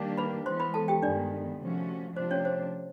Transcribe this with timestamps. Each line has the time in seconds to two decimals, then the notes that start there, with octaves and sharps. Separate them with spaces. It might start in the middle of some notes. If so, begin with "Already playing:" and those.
Already playing: D#3 G3 A#3 D4 G4
0.17 B4 B5
0.46 E3 G#3 B3 C5 C6
0.60 B4 B5
0.74 A4 A5
0.88 G4 G5
1.03 G2 D#3 G#3 B3 D4 D5
1.60 C3 F3 A3 C#4 F#4
2.16 C3 F3 A3 D4 F4 C5
2.31 C#4 C#5
2.45 C5